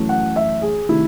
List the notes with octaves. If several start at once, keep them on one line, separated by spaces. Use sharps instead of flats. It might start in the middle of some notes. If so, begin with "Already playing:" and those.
Already playing: F#2 E3 A3
F#5
E5
G#4
C3 D#3 A3 E4